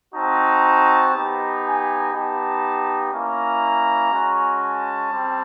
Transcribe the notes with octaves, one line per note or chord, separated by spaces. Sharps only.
C4 D#4 F#4 A5
B3 D#4 G4
G#5
B3 D#4 G4 A5
A#3 C#4 E4 A#5
G#3 C#4 F#4
A5
G3 C4